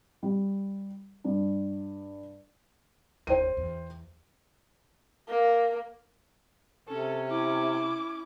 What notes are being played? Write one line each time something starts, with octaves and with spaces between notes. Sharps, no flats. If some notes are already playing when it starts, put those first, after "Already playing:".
G3
G2
F#1 D#2 C5 G5 D#7
E2
A#3
C3 C#4 A4
E4 D6